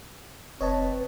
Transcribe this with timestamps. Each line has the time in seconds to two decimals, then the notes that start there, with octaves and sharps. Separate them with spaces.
0.61 F1 C4 B4 C#5 D#5 A5